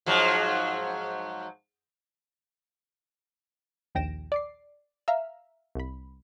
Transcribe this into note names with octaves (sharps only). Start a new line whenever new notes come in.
G#2 F3 F#3
A#1 D#2 G5 A#6 D7 E7
D5 D6 C7
E5 F5 A#5 E6 F6
C2 B5